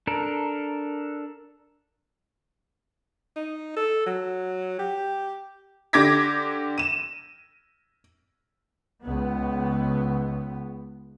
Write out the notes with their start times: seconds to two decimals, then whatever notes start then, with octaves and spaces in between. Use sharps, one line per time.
0.07 D4 A4 A#4
3.36 D#4
3.76 A4
4.06 F#3
4.79 G4
5.93 D3 G4 D6 G#6 A#6 B6
6.78 D#7 E7
9.04 C#2 B3